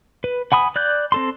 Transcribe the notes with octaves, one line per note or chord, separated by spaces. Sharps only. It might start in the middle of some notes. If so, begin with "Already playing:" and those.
B4
F#5 G#5 B5 D#6
D5 F#6 G6
C4 A4 C6